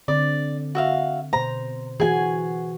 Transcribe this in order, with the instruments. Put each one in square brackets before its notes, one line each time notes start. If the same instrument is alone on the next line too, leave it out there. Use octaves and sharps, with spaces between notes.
[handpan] D3 C4 [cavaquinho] D5
[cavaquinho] F#4 E5 F5
[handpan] B2 C5 [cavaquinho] A#5
[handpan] E3 F#4 [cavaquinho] G#4 G#5